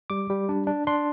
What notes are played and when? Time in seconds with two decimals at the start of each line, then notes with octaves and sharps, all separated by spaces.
0.10 G3 D6
0.30 G3
0.49 D4
0.67 D4
0.87 D4 C6